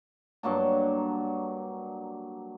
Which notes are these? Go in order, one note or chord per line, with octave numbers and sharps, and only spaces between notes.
G2 F#3 A#3 A5